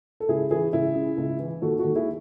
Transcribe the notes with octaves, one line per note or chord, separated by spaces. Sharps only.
A4
C#2 E4 G#4
E3 E4 G#4
C#2 E4 G#4
C#3
C#2
E3
D#2 F#4 A4
F#4 A4
D#2
E4 G#4